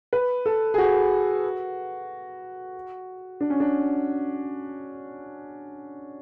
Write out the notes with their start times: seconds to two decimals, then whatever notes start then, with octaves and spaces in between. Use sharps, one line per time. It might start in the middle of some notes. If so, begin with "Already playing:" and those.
0.13 B4
0.46 A4
0.74 G#4
0.78 F#4
3.41 D4
3.50 C#4
3.60 D4